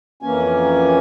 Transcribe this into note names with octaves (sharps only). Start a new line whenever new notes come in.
F2 E3 A#3 C#4 G#5